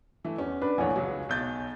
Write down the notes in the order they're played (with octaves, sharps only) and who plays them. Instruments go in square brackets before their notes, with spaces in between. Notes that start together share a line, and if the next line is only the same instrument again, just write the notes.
[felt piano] E3 A3
[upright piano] E2 [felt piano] C#4
[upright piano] D4 B4
[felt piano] F1 A#1 E3 [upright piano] C#5 F#5 G#5
[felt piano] C#2 F#3
B1 G6 A6